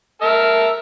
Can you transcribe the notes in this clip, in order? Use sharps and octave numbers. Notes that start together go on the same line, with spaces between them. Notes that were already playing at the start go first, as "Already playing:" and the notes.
A#4 E5 A5